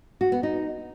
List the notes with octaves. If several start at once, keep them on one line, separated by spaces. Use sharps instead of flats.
F#4
B3
D#4